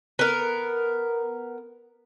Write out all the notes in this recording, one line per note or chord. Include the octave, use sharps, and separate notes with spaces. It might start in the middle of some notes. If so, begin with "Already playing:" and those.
B3 A#4